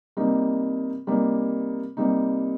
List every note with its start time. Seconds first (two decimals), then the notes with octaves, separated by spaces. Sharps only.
0.17 C3 G3 A#3 D#4
1.07 C3 G3 A#3 D#4
1.97 C3 G3 A#3 D#4